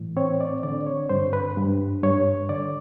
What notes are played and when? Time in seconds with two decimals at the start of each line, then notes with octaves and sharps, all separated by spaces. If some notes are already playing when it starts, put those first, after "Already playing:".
Already playing: A2 E3
0.17 C4 C#5
0.41 D5
0.63 D3 D5
0.87 C#5
1.09 G2 C5
1.33 B4
1.57 G2
2.03 G2 C#5
2.49 D3 D5